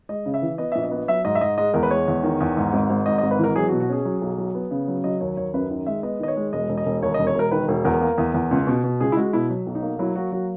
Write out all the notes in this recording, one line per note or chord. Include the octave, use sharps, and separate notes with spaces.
G#3 D#5
C#3
E5
E3
B3 D#5
A#1 E5
D#5
B3
F#3 E5
G#2 D#5
E5
G#2 D#5
G#3 D#5
E2 A#4
B4
G#3 C#5
E2
D#3
E2
G#2
G#1
G#1
G#2 D#5
D#5
G#1
B4
E3 A#4
F#3 G#4
F#4
B2
F#4
C#4 G#4
F#3
B1
F#3
B3
C#3
F#3
F#3 D#5
D#2 C#5
D#2 C#5
F#2 B4
D#3
G#3 E5
B3 D#5
D#3 D#5
C#5
G#3
E1 D#5
E1
D#5
E1
D#2 C#5
D#5
E1
C#5
E1 A#4
D#3 B4
E1
E2 A#4
A#3
E2
E2
C#2
B2
B2
C#2 G#4
E4
G#3 F#4
B2 E4
F#3
B1
D#4
A#3
F#3 E4
A#3 F#4
F#3 F#4